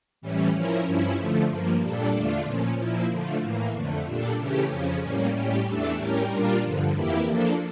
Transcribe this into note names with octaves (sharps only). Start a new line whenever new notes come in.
A2 E3 G3 C#4
F3 C#4 E4 A#4
G2 F3 C#4 E4
D3 F3 A3
G2 F3 A#3
A#2 G3 D4 A4
E2 D3 A3 D4 F4
A#2 F3 C#4
A#2 F3 A#3 E4
D3 F3 A3
A2 E3 A#3
F2 D3 A3
A#2 G3 D4 A4
C#3 E3 A3 C#4 G4
F2 C#3 F3 C#4
A2 G3 A#3 C#4
A2 G3 C#4 G4
E2 E3 A3 D4 A4
A2 G3 C#4 G4 A#4
A#2 G3 D4 F4 A#4
G2 D3 F3
F2 E3 A#3 E4 G4
F3 A#3 D4 A4